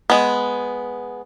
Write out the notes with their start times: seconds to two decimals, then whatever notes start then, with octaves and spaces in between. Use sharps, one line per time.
0.10 G#3 B3